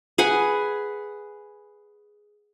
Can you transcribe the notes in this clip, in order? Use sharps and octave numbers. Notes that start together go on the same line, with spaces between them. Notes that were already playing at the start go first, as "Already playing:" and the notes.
G#4 B4 F#5 G#5